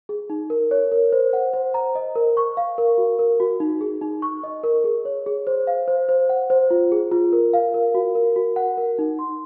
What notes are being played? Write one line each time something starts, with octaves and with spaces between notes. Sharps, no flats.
G#4
D#4
A#4
C#5
A#4
C5
F#5
C5
A#5
D#5
A#4
C#6
F5
A#4
F#4
A#4
F#4
D#4
G#4
D#4
C#6
D#5
A#4
G#4
C#5
G#4
C5
F5
C5
C5
F#5
C5
F4
G#4
F4
A#4
F5
A#4
F#4
A#4
F#4
F#5
A#4
D#4
C6